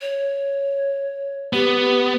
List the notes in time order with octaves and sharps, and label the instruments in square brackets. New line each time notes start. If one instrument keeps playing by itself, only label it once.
[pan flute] C#5
[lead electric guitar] B3 [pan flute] G4